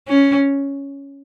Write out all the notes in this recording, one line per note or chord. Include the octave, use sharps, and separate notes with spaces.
C#4